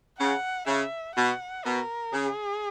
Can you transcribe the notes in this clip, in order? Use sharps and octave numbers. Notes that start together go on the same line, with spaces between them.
C#3 F#5
C#3 E5
B2 F#5
B2 A#4
C#3 G#4